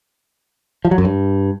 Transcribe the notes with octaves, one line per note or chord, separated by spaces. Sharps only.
F3
F#3
F#2
G2